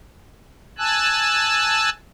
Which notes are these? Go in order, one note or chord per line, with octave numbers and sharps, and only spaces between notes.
G#5 A5 E6 F#6